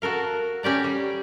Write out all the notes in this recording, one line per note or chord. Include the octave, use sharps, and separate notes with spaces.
F#4 A4 A#4 F5
C#4 G4 D5 A#5
G3